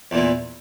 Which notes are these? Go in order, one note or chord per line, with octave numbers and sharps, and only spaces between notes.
E2 A#2 E3